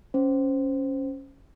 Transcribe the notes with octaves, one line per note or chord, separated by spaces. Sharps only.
C#4 C5